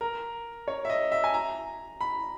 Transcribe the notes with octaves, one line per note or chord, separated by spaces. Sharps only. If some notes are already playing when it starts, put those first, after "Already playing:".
A#4
C#5
E5
D#5
E5
G#5
A#5
B5